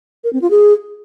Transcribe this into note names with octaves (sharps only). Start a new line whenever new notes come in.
A#4
C4
F4
G#4